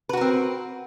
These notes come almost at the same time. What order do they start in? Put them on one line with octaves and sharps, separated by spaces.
B4 F#4 A#4 C4